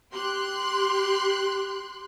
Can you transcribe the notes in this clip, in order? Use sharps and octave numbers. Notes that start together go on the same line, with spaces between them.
G4 C6 F#6